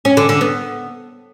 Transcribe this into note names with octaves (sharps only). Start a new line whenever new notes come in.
C#4
D3
D3
B3